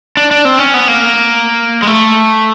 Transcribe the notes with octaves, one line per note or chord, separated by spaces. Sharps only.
D4
D4
C4
C#4
B3
A#3
G#3
A3